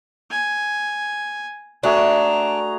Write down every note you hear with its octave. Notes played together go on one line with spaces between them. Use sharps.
G#5
A3 D4 F#4 G#4 A#5